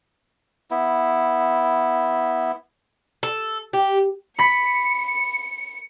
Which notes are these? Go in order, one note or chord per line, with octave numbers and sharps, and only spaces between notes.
B3 E4
A4
G4
B5 B6 C#7